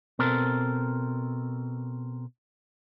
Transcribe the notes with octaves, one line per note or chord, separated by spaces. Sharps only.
B2 C4 A4 A#4